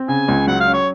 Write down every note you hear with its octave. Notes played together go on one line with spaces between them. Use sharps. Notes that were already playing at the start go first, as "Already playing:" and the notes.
Already playing: C4
C#3 G#5
C#2
F#3 F#5
F5
C#4
C#5